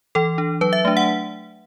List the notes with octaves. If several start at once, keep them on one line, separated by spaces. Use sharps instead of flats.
E3 A4
D4
F#3 B4
E5
A3 D4
F#5